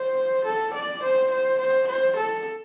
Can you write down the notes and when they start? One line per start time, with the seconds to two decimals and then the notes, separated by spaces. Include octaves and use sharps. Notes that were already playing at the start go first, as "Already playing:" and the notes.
Already playing: C5
0.45 A4
0.74 D5
1.03 C5
1.31 C5
1.59 C5
1.88 C5
2.17 A4